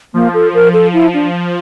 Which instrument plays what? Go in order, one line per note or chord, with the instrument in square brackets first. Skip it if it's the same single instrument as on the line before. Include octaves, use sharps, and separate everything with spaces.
[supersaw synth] F3 [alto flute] A#3
[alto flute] A4
A#4
A4
[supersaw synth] F3 [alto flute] E4
[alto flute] D4